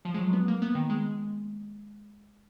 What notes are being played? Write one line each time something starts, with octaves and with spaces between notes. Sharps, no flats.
F3
G#3
F#3
B3
A#3
B3
D#3
G#3